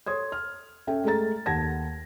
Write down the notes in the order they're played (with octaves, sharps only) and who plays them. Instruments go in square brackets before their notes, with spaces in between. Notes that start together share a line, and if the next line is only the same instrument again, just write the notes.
[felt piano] A4 C#5 C6 D#6 G#6
F6
C#4 A4 E5 G5
G#3 A3 A4 A#5 A6
D#2 F#5 A5 G#6 A#6